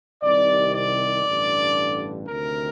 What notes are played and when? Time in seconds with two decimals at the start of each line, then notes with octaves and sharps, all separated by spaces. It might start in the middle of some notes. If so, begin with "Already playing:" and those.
0.23 C2 C3 D#3 D5
0.74 D5
1.26 A1 G2 D3
2.28 D2 C3 D#3 A#4